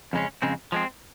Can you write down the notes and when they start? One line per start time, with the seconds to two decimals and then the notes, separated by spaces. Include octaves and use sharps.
0.13 F2 C#3 G#3 C#4
0.42 F2 C#3 G#3 C4
0.72 F3 G#3 C4